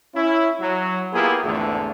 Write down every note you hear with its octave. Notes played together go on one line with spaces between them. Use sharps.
C#4 E4
F#3
A#3 B3 E4 F4 G4 G#4
G#1 E2 D3 A3